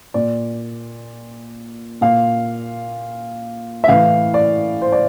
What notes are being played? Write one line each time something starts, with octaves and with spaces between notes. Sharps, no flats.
A#2 D5
A#2 F5
E5
A2 E3 F5
D5
C5
D5